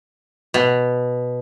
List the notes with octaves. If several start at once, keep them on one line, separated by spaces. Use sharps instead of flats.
B2